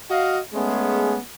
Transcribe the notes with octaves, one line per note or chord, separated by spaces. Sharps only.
F#4 D#5 F5
G#3 A3 B3 C#4 G#4